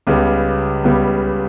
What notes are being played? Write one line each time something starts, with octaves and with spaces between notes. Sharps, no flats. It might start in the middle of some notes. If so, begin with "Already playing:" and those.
C#2 C#3 G3 B3
C#2 C#3 G3 B3